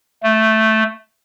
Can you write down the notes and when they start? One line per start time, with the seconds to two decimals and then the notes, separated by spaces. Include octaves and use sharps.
0.23 A3